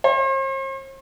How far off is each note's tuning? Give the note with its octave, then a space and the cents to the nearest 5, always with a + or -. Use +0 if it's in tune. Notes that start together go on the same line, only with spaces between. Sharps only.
C5 +45